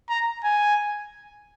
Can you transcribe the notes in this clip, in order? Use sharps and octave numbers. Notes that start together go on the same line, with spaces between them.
A#5
G#5